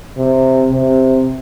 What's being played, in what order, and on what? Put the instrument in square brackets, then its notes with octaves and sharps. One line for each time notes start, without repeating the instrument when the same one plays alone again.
[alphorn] C3
C3